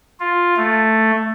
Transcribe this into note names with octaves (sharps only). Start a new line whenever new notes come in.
F4
A3